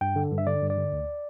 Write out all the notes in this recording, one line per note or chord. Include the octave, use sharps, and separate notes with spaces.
G2 G5
D3
G2
E5
D3 D5
G2
D5
D3
D2